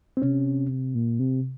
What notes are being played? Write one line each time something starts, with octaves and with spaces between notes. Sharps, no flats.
C4
C3 C#4
A#2
C3